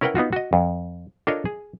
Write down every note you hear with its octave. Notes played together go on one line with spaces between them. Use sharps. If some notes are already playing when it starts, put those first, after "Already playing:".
C#4 E4 A#4 B4 F#5 G5
B3 D#4 F4 F#4
F#4 D#5
F2
D4 F4 A4 A#4 C#5 D#5
G#4